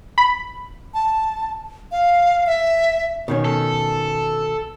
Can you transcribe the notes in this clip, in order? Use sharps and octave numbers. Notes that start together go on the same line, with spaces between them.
B5
A5
F5
E5
B2 D#3 C#4
A4